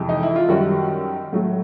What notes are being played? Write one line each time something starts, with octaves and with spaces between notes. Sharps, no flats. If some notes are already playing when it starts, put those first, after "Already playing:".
Already playing: F2 C3 E3 G#3
D#4
E4
F4
F#2 D#3 G3 F#4
A2 F#3 A3